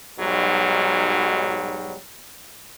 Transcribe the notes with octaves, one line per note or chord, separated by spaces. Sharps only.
B1 G#2 F#3 G3